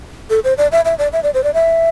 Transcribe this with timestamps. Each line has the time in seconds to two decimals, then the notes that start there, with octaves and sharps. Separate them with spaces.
0.30 A4
0.44 C5
0.58 D5
0.72 E5
0.85 E5
0.99 D5
1.13 E5
1.23 D5
1.34 C5
1.44 D5
1.54 E5